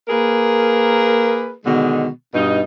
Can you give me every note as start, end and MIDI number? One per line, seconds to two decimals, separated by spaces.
0.09 1.52 58
0.09 1.52 68
0.09 1.52 70
0.09 1.52 71
1.65 2.07 47
1.65 2.07 50
1.65 2.07 51
1.65 2.07 56
2.34 2.61 43
2.34 2.61 47
2.34 2.61 63